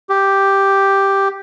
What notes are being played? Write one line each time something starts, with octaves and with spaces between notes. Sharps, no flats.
G4